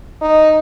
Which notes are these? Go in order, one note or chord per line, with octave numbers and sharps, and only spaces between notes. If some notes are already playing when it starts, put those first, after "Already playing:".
D#4